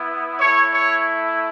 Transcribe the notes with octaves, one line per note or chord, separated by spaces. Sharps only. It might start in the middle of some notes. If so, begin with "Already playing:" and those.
Already playing: B3 E4
A3 E4 C#5
C#5